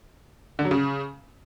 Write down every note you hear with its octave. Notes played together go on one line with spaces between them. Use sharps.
D3
F#3
C#3